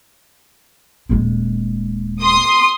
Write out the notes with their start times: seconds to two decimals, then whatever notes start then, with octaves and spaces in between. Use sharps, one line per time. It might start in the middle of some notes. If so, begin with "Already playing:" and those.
1.09 D#1 G#3
2.22 C6 D#6